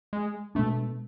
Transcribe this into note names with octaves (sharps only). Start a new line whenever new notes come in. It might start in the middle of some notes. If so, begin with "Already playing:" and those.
G#3
B2 G#3 A3 B3 D4